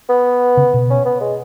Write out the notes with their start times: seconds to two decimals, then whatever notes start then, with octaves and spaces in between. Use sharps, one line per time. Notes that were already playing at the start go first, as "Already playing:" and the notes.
0.09 B3
0.57 C#3
0.74 B2
0.90 C#4
1.05 B3
1.21 G#3